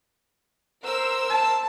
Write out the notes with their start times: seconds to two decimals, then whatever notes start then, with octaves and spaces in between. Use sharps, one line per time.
0.84 A#4 C5 E6
1.30 A5